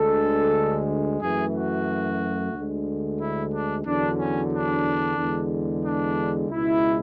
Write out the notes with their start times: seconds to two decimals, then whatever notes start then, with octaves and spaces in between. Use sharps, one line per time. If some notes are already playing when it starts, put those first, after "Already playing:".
Already playing: D2 D3 G#3 A4
1.21 F#2 E3 A3 G#4
1.55 F#4
2.54 D2 D3 G#3
3.20 E4
3.52 D4
3.86 E2 D3 F#3 D4
4.18 C#4
4.52 D4
5.17 E2 D3 G#3
5.84 D4
6.50 C#2 B2 G#3 E4